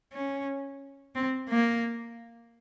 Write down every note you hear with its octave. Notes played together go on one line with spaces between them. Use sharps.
C#4
C4
A#3